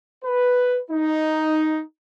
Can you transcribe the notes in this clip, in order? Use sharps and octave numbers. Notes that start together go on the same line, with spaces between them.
B4
D#4